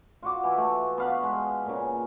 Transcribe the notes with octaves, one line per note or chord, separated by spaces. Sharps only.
F4 F#4 D6
E3 E4
A3
B3 F5 B5
G#3
A#2 C#3